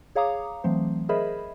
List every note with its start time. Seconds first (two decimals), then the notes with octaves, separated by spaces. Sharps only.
0.15 G#4 C#5 F5 A#5 D6 D#6
0.64 E3 F#3 A3 C4 C5
1.09 G#4 A#4 C5 D#5 E5 B5